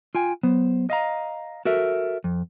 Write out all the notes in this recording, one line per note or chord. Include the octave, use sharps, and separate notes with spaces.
F4 G5 G#5
F#3 B3 C5
D#5 F5 A#5
F#4 A4 A#4 E5
F2